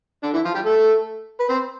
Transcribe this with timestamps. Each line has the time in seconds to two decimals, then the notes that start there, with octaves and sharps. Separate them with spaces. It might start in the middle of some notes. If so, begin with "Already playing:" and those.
0.23 D3 D4
0.33 E3 E4
0.45 F3 F4
0.55 G3 G4
0.65 A3 A4
1.40 B4
1.50 C4 C5